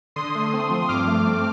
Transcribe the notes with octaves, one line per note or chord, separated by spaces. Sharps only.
D3 C6 D#6
A3
C4
F3
G2 D6 F6
A3
C4